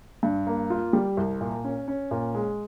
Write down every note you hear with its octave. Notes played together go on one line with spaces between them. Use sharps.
G2
A#3
F4
G3
C2
A#2
C#4
C#4
A#2
G#3